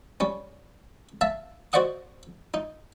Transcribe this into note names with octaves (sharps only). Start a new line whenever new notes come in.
G3 C#4
E5 F5 A5
F#4 C5 D5 D#5 F#5 D#6
D#4